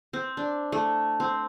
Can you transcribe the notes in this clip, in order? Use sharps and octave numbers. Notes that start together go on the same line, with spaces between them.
C4
D4
A3
C4